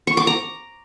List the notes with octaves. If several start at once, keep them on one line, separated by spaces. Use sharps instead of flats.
C#6
D6
A#5